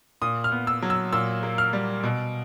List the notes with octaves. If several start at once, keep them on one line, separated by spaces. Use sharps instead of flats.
A#2 D#6
F6
B3
E6
F#3
E6
A#2 E6
A#3
F6
G3
B2